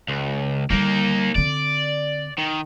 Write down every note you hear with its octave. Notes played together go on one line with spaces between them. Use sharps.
C#2
D3 G3 A#3 D#4
D3 C4 D5
D#3